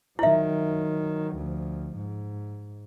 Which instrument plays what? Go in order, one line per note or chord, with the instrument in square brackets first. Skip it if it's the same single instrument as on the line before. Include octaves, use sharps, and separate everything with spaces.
[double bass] D#3 F#3 [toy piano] E4 E5
[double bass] D2 F3
G#2